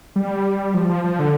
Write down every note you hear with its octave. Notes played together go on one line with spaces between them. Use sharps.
G3
F3
F3
F3
D3